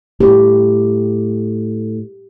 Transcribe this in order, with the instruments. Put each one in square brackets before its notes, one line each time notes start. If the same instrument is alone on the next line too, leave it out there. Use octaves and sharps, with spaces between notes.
[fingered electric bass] A2 [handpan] G4